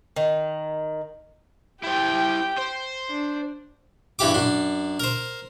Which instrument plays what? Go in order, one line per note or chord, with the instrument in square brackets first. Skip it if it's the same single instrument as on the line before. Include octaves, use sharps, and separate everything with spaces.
[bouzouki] D#3
[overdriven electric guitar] E4 C5 [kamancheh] G4 G5
[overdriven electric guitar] C5
[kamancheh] D4
[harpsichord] G2 E3 G4 D6
F#2 D4
A#4 C5